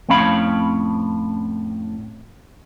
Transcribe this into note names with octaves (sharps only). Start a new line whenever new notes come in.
F2 A2 C4 C#4 F5 B5